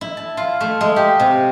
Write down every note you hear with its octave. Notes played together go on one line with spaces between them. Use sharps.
E4
A5
F4
A3
G#3
G4
C3